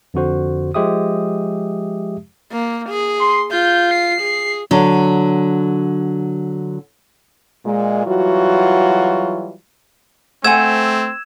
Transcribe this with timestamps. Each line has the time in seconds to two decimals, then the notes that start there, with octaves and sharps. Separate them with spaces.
0.14 F2 D3 F#4 C5
0.74 F3 G#3 G4 E5 D#6
2.52 A#3
2.89 G#4
3.20 C6
3.51 F4 G6
3.91 C7
4.21 G#4
4.71 D3 F#3
7.65 A#2 G#3
8.06 E3 F#3 G3 F4 F#4
10.44 A3 C4 C5 F#5 G#5 E6 G#6 E7